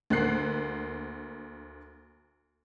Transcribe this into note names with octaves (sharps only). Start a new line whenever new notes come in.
D2 A#3 F#6 C7